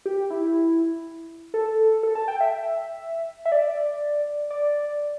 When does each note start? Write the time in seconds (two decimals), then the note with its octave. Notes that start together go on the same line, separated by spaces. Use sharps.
0.06 G4
0.30 E4
1.54 A4
2.03 A4
2.15 A5
2.28 G5
2.40 E5
3.45 E5
3.52 D5
4.50 D5